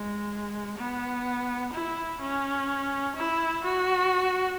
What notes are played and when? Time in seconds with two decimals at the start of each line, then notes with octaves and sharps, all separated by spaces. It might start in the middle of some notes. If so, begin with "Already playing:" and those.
Already playing: G#3
0.77 B3
1.73 E4
2.21 C#4
3.15 E4
3.64 F#4